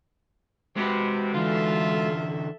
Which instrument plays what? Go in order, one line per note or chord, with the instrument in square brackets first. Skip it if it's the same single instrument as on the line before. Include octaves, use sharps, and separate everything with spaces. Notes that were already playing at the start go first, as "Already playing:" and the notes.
[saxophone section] C3 [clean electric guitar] G#3 F#4 B4
[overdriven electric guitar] D3 E3 [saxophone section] F4 [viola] A4 E5